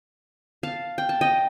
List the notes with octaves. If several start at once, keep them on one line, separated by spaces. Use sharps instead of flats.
F5 A5
G5
A5
D#5 G5